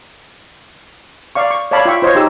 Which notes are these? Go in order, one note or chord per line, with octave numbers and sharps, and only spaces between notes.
D5 F5 C#6
C#6
C#5 D5 F5 A5 B5
F4 E5 G5 C#6
F4 C5 C#5 D#5
D#4 G4 G#4 E6